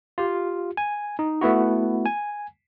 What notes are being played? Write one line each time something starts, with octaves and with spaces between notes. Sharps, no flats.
F4 G4
G#5
D#4
A3 B3 E4 F#4
G#5